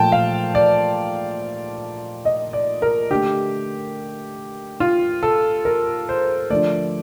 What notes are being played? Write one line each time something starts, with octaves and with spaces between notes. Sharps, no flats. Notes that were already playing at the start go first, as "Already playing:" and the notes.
Already playing: A#2 F3 A3 G5 A5
F5
D5
D#5
D5
A#4
D3 A3 G4
F4
A4
A#4
C5
D3 F3 A3 D5